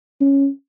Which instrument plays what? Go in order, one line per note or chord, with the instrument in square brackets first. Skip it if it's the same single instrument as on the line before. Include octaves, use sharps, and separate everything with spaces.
[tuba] C#4